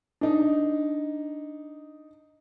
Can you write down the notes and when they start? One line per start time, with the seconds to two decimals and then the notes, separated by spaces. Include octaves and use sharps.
0.21 D4 D#4